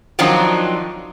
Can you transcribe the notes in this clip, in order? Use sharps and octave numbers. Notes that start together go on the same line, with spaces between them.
D#3 F3 F#3 C4 D4 D#4